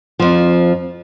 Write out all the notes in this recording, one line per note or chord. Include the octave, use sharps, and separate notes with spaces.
F2 F3